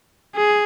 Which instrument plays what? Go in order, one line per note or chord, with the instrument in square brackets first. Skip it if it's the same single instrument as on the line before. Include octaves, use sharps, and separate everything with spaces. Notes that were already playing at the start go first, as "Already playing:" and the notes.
[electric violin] G#4